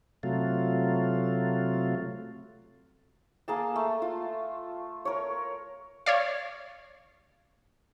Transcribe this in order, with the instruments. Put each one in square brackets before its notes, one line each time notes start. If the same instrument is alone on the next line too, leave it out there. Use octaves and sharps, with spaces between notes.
[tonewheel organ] C3 F#3 A3 F4
[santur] A#3 G#4 A5
A3
F4
A#4 C#5
[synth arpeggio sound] C#5 D5 F5